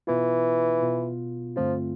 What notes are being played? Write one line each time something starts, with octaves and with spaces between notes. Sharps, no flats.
B2 E3 B3 F4
B2 B3 F4
G2 D3 F3 A3 C4 F4